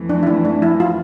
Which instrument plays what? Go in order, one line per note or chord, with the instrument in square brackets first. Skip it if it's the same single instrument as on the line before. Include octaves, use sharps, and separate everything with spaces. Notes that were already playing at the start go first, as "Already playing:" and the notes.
Already playing: [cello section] F2 E3 A3
[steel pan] D4
E4
D4
D4
E4
F4